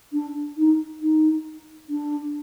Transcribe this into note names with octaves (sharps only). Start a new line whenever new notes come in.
D4
D#4
D#4
D4